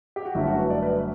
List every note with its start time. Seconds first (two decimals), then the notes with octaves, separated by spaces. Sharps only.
0.16 G4
0.25 F#4
0.35 G1 F#2 D3 A3 E4
0.47 F#4
0.59 B4
0.70 D5
0.83 B4